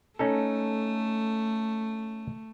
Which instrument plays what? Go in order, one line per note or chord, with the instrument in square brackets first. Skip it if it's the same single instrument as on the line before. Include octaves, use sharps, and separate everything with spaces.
[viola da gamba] A3 [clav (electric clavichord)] C#4 D#4 A4